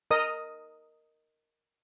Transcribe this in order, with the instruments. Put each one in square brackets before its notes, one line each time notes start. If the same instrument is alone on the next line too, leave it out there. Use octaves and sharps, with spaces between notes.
[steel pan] A#4 D#5 D#6